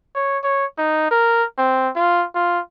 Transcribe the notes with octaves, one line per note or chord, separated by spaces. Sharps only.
C#5
C#5
D#4
A#4
C4
F4
F4